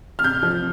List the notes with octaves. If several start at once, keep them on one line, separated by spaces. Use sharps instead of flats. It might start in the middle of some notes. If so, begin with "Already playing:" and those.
F6
C3 G6
F3